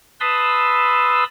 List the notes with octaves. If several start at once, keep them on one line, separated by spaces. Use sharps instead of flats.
B4 A5 B5 C6 D#6 E6